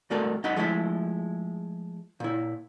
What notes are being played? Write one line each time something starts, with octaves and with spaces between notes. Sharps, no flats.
C2 G#2 A3 F#4 A#4 D5
F#2 D#4 D#5 F#5 B5 C6
F3 G#3 A3 E4 D5 B5
A#2 E4